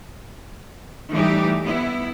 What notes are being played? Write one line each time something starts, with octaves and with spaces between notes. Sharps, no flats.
E3 G3 A3 D#4 E4 G4
B3 E4